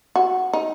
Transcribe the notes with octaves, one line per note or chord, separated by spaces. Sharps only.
F#4
D#4